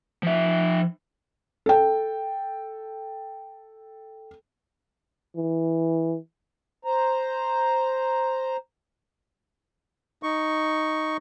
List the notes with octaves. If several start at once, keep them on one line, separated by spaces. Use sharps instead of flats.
F3 E5
A4 G5
E3
C5 A#5
D#4 C#6